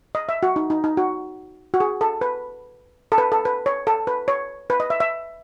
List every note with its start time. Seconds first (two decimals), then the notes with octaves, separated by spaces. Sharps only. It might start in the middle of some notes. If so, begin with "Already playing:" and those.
0.15 D#5
0.29 E5
0.43 F#4
0.56 D#4
0.70 D#4
0.84 D#4
0.97 F#4
1.74 F#4
1.80 G#4
2.01 A4
2.21 B4
3.12 A4
3.18 B4
3.32 A4
3.45 B4
3.66 C#5
3.87 A4
4.07 B4
4.28 C#5
4.70 B4
4.80 D#5
4.90 E5
5.00 E5